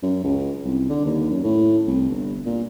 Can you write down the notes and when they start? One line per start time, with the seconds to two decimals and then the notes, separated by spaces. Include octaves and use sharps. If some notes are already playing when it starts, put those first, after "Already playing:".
0.02 F#2
0.24 C#2
0.65 C2
0.89 D3
1.05 D#2
1.31 F#2
1.44 A2
1.87 C2
2.10 G1
2.46 A#2